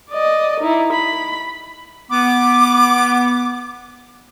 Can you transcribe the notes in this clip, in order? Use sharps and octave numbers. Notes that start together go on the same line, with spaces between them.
D5 D#5
D#4 E4
B5
B3 D6